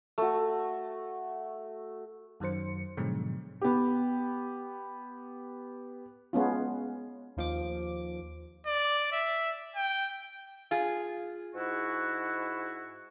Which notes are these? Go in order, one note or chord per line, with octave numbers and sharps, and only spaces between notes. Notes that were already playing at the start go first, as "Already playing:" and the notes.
A3 F#4
F#2 D#3 F#3 C5 C#7
G#2 B2 D3 F3 F#3 G#3
B3 G4
G#3 B3 C#4 F4
D#2 F3 D6
D5
E5
G5
F4 G#4
G#2 E4 F#4